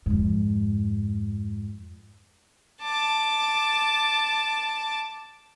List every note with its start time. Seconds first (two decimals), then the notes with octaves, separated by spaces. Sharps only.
0.06 F2 G#2
2.83 A5 D6